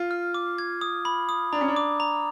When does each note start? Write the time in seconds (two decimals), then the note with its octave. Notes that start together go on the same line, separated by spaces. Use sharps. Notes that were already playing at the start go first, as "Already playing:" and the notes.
Already playing: F4
0.11 F6
0.34 D6
0.58 G#6
0.81 D#6
1.05 B5
1.29 D#6
1.52 D4 A#5
1.61 C#4
1.68 D4
1.76 D6
2.00 A#5